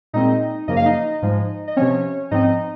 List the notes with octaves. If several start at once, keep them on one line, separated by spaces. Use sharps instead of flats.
A#2 G#3 C4 D#4 D#5
F#2 C#3 F3 A#3 D#5
F5
D#4 D#5
G#2 F3 G#3
D#5
C3 F3 C4 C#4 C#5
G#2 F3 C4 D#4 D#5